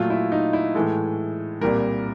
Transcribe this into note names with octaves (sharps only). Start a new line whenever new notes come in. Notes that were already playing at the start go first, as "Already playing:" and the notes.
Already playing: A#2 F#3 A3 F4
E4
D#4
E4
A2 E3 G#3 A4
C2 A#2 G3 A#4